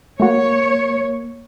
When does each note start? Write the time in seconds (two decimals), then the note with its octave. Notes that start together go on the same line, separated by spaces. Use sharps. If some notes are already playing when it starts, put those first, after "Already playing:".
0.20 A3 A#3 F#4 C#5